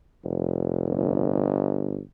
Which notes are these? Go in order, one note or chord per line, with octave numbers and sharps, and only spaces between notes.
F1
G1